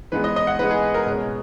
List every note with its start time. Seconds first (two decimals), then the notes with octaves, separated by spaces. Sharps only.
0.12 E3 G#3 B3 B4
0.24 D#5
0.36 D#5
0.47 F#5
0.59 E3 G#3 B3 B4
0.71 G#4
0.94 A#4
1.06 B2 G#3 C#4